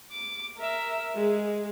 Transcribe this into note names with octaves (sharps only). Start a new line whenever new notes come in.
D6
A#4 E5
G#3 G#4